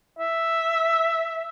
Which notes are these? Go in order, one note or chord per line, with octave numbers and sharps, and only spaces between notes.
E5